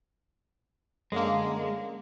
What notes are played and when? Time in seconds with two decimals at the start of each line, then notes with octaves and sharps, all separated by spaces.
1.12 F#2 D3 G#3 A#3